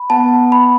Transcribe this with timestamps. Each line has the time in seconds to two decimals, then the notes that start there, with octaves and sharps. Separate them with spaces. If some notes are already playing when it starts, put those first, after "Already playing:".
Already playing: B5
0.10 B3 A5
0.52 B5